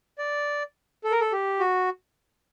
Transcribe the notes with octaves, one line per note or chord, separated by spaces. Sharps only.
D5
A4
A#4
A4
G4
F#4